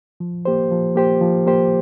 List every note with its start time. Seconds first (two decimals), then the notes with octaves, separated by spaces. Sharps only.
0.20 F3
0.45 A#3 G4 C5
0.71 F3
0.95 A#3 G4 C5
1.21 F3
1.47 A#3 G4 C5